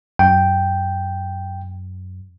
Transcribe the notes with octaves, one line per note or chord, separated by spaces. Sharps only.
F#2 G5